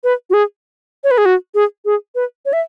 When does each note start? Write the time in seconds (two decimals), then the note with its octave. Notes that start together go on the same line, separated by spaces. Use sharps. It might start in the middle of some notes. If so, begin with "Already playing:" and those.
0.04 B4
0.30 F#4
0.34 G#4
1.04 C#5
1.11 B4
1.18 G#4
1.25 F#4
1.55 G#4
1.85 G#4
2.15 B4
2.46 C#5
2.53 E5